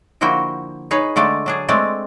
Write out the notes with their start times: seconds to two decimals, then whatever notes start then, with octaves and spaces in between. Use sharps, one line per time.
0.21 D3 F3 A#3 E4 F#4 G5
0.91 D#4 G#4 B4 C#5
1.16 D3 G#3 A3 D5
1.46 F#3 D4 G#4
1.68 G#3 A3 C4 D5